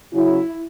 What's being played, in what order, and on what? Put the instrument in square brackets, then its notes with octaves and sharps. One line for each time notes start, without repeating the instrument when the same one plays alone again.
[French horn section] C#3 F#3 C#4 E4